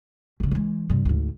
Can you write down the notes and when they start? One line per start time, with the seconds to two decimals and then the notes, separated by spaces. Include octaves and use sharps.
0.40 G1 C#3
0.51 E3 G#3
0.89 G2 C3
1.05 D2 G#2